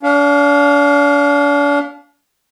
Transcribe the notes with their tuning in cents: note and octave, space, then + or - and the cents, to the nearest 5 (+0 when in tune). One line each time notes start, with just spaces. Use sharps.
D4 -40 F5 +0